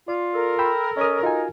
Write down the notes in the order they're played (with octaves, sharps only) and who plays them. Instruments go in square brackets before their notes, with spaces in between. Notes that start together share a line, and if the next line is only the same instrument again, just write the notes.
[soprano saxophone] F4 [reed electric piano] D5
[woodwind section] A4 A#4
[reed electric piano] G5 B5 E6
[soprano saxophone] C#4 [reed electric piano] D#5 D#6
[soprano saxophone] D#4 [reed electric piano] F4 F#4 G#5